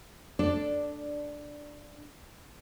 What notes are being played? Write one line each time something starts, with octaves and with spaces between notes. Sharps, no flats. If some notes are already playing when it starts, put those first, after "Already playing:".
D4 A4 D5